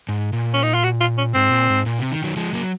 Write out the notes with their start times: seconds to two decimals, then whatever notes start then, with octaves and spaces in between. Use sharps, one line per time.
0.09 G#2
0.33 A#2
0.54 C#4
0.63 D#4
0.74 F4
0.84 F#4
1.01 F4
1.18 C#4
1.35 G#2 C4
1.52 A#2
1.70 G#2
1.86 A#2
1.99 C3
2.12 D#3
2.24 D#3 F#3
2.37 F3 G#3
2.53 F#3 A#3